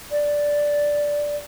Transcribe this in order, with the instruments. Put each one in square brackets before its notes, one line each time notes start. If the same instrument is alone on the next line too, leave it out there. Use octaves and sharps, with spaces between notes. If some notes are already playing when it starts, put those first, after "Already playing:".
[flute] D5